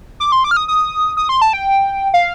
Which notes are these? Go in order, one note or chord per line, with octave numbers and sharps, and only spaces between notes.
D6
C6
D6
F6
D#6
D#6
D#6
C6
A5
G5
F5